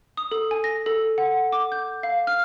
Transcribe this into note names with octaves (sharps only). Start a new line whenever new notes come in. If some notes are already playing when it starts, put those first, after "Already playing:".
D#6
A4
G#5
A#6
A4
F#5
D6
G6
F5
F6